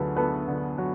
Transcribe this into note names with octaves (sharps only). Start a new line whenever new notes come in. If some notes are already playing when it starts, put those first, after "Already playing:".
Already playing: D2 D3 F#3 G#4 A4 B4
B3 A4 B4
D3
F#3